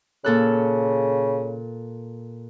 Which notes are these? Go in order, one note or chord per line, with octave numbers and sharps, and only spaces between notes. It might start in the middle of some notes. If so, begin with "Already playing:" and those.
A#2 C#3 A4 F#6